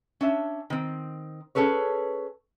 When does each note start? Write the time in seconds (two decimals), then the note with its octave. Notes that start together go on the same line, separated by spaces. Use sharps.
0.21 C#4 D4 E5
0.70 D#3 C4
1.55 C#4 G#4 A4 B4 C#5